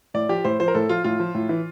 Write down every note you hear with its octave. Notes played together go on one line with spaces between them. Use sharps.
A2 D5
F3 G4
A2 C5
F3 C5
A#4
A2 A4
F3 F4
A2 F4
F3
A2
E3